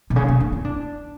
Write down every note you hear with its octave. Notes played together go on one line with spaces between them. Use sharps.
B2
C#3
B3
D4
E4
D4